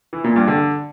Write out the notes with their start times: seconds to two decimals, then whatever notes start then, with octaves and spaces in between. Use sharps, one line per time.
0.13 E3
0.24 A#2
0.36 G2
0.48 D3